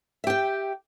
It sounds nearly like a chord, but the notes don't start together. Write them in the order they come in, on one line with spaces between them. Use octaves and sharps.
E5 G4 G5